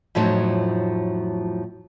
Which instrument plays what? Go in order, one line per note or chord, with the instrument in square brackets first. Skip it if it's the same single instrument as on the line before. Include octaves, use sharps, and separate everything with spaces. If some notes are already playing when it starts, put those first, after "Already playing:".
[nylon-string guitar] F2 A2 F3 F#3 D#4